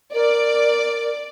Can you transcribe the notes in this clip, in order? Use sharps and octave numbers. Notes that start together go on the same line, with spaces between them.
A#4 D5